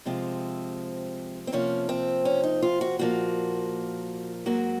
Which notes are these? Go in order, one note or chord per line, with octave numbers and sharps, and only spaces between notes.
C3 F3 G#3 C4
C4
C3 F3 A#3 C#4
C4
C#4
D#4
F4
F#4
A#2 F3 A#3 F#4
G#2 F#3 A#3 F#4